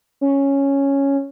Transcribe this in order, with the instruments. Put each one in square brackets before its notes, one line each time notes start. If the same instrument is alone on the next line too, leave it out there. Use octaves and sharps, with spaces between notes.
[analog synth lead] C#4